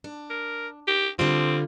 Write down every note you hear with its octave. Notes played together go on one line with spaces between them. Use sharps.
D4
A#4
G4
D3 G3 C4 F4